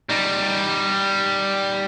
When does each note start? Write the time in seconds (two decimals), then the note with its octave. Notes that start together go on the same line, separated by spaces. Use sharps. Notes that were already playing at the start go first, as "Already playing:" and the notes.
0.10 G3 D#4